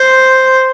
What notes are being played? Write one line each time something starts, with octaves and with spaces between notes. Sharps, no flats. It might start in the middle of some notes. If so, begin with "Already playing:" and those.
Already playing: C5